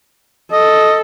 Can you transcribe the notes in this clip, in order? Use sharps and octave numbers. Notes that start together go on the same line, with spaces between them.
A4 D#5